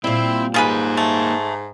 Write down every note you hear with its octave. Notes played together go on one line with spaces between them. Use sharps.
A#2 G3 C4 E4
G#2 A#3 D#4 F4 G#4 B4
A3